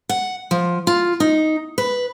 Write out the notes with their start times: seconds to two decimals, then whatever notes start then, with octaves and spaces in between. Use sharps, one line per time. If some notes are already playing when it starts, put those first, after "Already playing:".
0.09 F#5
0.51 F3
0.87 F4
1.20 D#4
1.78 B4